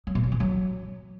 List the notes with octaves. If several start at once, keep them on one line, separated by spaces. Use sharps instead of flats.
F#3
A#2
B2
E3
F#3